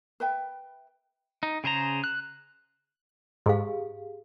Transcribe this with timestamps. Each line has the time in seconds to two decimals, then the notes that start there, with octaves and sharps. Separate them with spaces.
0.20 B4 E5 G5
1.43 D#4
1.64 C#3 G#4 C5 A#5
2.04 F#6
3.46 G#2 G4 G#4 F5